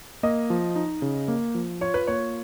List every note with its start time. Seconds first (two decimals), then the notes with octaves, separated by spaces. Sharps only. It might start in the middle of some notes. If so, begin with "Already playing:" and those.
0.23 A#3 D#5
0.50 F3
0.76 D#4
1.02 C#3
1.28 A#3
1.55 F3
1.81 F4 C#5
1.94 B4
2.07 A#3 C#5